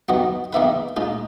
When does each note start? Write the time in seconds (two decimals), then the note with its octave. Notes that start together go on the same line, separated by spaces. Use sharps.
0.09 D#3 F#3 B3 F#4
0.53 E2 D#3 A#3 E4 B4
0.97 A#2 G#3 D#4